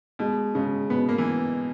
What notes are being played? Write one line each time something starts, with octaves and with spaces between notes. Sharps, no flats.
B2 G#3
C#3 G#3
B2 B3
A#3
E3